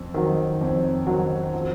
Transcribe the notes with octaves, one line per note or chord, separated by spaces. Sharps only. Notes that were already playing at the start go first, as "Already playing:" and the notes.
Already playing: F2
D#3 F#3
F2
D#3 F#3
F3